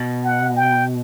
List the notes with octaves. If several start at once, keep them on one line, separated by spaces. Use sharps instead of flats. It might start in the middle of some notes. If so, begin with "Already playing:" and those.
Already playing: B2
F#5
G5